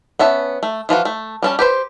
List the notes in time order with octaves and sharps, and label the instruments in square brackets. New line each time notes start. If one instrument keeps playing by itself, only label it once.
[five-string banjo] B3 C#4 E5 A5
A3
E3 F3 F4 F#4
A3
G3 C#4 A5
G4 B4 C5